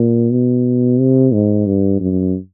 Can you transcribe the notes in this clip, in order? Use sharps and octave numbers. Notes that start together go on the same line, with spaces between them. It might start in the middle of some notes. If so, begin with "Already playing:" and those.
Already playing: A#2
B2
C3
G#2
G2
F#2